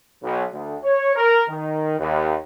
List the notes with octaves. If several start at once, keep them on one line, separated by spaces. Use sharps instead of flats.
B1
D2
C#5
A#4
D#3
D#2